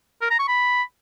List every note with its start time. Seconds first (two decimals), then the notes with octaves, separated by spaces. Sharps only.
0.21 A#4
0.30 A#5
0.39 C#6
0.48 B5